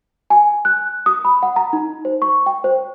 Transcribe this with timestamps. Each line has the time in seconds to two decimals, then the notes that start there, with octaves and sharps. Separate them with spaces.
0.30 G#5
0.65 F#6
1.06 D#6
1.25 B5
1.43 F#5
1.56 A#5
1.73 D#4
2.05 C5
2.22 C#6
2.46 G5
2.64 C5